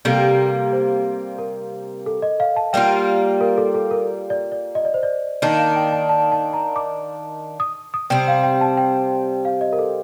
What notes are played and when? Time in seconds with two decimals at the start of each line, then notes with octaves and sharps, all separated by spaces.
0.05 C3 G3 A#3 A4
0.73 C5
1.38 A#4
2.06 A4
2.22 D#5
2.40 F5
2.56 A5
2.73 G3 A#3 F4 G5
3.41 A#4
3.58 A4
3.74 A4
3.91 A#4
4.30 D5
4.52 D5
4.75 D#5
4.85 D5
4.94 C5
5.03 D5
5.42 D#3 A#3 D4 D#5
5.58 F5
5.76 G5
5.92 A5
6.09 A5
6.32 A5
6.53 A#5
6.76 D6
7.60 D#6
7.94 D#6
8.10 C3 G3 C4 G5
8.28 F5
8.43 G5
8.61 A5
8.77 G5
9.45 F5
9.61 D#5
9.73 A#4
9.79 A4